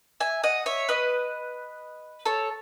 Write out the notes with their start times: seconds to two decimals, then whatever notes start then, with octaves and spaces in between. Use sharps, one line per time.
0.20 E5 G#5
0.44 D#5 F#5
0.66 C#5 E5
0.89 B4 D#5
2.26 A4 C#5